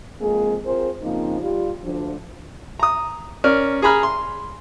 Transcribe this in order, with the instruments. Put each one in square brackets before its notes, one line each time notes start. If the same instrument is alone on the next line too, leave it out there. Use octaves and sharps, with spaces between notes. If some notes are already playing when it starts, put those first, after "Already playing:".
[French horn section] F2 G#3 A#3 C4 G#4
C4 F4 G#4 A#4 C5
C#3 F3 A#3 C4 D#4
G3 F4
D2 F3 D4
[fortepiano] A#5 D#6
C#4 A#4 D5 F6
G#4 G#5 A#5 B5 F6
C6